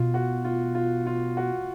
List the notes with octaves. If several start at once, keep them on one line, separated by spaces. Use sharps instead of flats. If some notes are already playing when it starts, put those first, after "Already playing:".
Already playing: B2 F4
F#4
F4
F4
F4
F#4